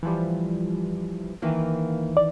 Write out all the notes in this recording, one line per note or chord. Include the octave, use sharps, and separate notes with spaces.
E3 F3 G3
D#3 E3 A#3
D5